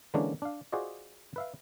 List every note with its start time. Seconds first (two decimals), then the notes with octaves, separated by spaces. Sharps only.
0.14 D3 E3 G#3 A#3 C#4 D4
0.42 D4 F5
0.72 F4 F#4 G#4 C5 D5 D#5
1.36 B4 E5 F5